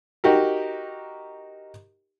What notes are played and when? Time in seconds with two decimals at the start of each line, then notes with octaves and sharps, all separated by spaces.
0.24 D#4 F#4 G4 A#4